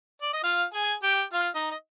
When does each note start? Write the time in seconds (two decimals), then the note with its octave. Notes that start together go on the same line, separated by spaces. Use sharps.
0.22 D5
0.33 D#5
0.43 F4 F5
0.74 G#4 G#5
1.03 G4 G5
1.33 F4 F5
1.55 D#4 D#5
1.72 D#5